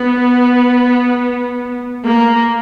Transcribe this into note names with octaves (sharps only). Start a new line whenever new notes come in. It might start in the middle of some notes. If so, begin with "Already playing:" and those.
Already playing: B3
A#3